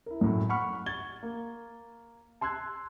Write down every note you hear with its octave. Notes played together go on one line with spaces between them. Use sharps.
E4 A#4
F#2 A2
F#5 B5 C#6 F6
C#6 G#6 A6 G7
A#3
A5 C6 E6 F#6 G#6